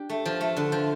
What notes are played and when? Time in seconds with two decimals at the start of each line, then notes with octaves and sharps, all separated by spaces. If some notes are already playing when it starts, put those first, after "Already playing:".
Already playing: D4 G4
0.10 A3
0.25 F3
0.41 A3
0.57 D3
0.72 F3